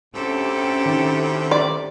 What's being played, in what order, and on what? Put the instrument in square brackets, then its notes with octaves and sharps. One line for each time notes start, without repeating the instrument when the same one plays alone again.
[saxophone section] D2 A2 C3 [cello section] C#4 G4 A4
[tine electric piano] D#3
[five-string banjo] D5